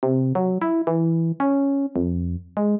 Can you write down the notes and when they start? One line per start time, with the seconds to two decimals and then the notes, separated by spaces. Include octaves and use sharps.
0.03 C3
0.35 F#3
0.62 E4
0.87 E3
1.40 C#4
1.96 F2
2.57 G#3